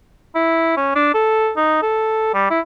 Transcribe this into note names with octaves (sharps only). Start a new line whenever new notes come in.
E4
C#4
D4
A4
D#4
A4
G3
E4